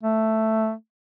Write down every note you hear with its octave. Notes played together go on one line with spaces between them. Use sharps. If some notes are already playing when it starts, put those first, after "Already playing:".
A3